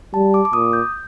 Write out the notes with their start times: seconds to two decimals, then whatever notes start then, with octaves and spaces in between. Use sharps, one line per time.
0.14 G3 A5
0.34 D6
0.45 D6
0.53 A#2 D#6
0.73 G6